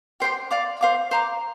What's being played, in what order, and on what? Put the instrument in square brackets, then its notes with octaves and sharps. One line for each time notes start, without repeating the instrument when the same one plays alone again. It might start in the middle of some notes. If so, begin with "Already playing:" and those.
[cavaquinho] G4 C5 G5 C6
D5 F5 D6
C5 F5 D6
C5 A#5 D6